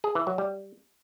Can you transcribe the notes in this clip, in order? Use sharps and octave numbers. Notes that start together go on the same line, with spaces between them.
G#4
E3
F#3
G3